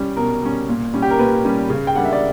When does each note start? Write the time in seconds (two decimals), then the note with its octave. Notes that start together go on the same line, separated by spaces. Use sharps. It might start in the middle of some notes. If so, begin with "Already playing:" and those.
Already playing: G3 C#4
0.16 B2 A#4
0.42 G3 C#4
0.68 A#2
0.94 G3 C#4
1.02 G4
1.10 A#4
1.19 A#2 B4
1.45 G3 C#4
1.70 C#3
1.87 G5
1.95 G3 A#3 D4 F#5
2.05 E5
2.13 D5